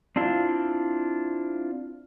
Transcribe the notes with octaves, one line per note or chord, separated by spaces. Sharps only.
C4 D4 E4 F4